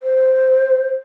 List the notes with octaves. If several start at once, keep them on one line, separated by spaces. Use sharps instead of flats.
C5